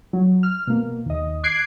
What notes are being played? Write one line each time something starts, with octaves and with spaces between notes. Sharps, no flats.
F#3
F6
B2 A#3
D#2 D#5
D6 F#6 G#6 C7 D7